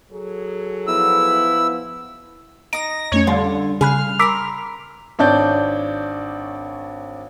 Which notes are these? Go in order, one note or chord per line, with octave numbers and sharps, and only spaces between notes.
F#3 G#4 A4
F3 B3 E4 E6
D#4 D#5 D#6 A#6 D7
F2 A3 C#4 C#5
D3 G3 F4
C#3 G#4 F5 B5 F6 F#6
A#4 B5 C6 D6 E6 B6
G#1 D4 C#5 D5 A5 G6